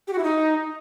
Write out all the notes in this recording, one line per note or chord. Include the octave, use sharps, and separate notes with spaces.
G4
F#4
E4
D#4